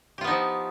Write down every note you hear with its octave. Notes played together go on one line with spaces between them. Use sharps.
F3 B3 D#4 F4 G4